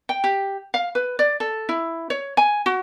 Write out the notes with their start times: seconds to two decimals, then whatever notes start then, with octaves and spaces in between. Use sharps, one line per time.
0.09 G5
0.24 G4
0.74 F5
0.95 B4
1.19 D5
1.40 A4
1.69 E4
2.10 C#5
2.37 G#5
2.66 F#4